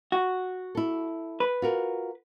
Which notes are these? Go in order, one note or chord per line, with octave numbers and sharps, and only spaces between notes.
F#4
E4 A4
B4
F4 F#4 A#4